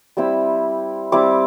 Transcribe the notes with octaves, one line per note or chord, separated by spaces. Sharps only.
G3 C4 E4 E6
G3 C4 E4 D6